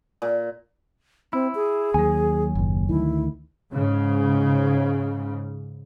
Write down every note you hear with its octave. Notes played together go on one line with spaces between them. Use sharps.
A#2
C4 E4
G#4
D#2 F#3 G#5
F#1 D#2
D2 D#3 E4
G#2 C#3